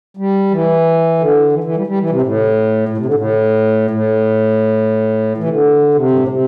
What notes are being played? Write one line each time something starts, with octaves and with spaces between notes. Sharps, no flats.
G3
E3
D3
E3
E3
G3
G3
E3
C3
A2
A2
C3
D3
A2
A2
E3
C3
D3
C3
G2
A2
C3